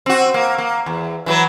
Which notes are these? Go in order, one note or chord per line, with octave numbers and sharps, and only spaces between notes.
C4 F#4
A#3
A#3
E2
E3 F#3 B4